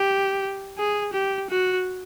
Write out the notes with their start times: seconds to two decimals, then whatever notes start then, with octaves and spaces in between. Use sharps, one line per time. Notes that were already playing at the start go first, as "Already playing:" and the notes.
Already playing: G4
0.78 G#4
1.13 G4
1.50 F#4